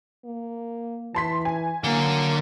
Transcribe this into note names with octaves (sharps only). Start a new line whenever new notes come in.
A#3
E3 A5 C6 B6
G#5
D3 F#3 A#3